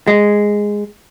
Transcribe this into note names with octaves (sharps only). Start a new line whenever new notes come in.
G#3